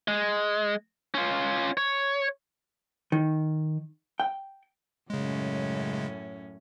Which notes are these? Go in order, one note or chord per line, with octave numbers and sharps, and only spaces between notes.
G#3
C#4 F4
C#5
D#3
G5
F#2 A2 C#3 G#3 C#4